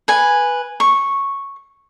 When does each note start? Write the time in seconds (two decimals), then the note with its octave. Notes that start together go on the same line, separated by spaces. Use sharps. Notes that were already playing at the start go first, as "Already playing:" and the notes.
0.08 B4 G#5
0.80 C#6